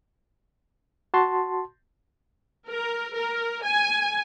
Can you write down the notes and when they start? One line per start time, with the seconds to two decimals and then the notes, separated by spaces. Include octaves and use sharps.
1.14 F#4 A5 C6
2.69 A#4
3.15 A#4
3.65 G#5